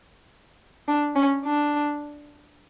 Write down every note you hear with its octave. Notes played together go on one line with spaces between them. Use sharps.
D4
C#4
D4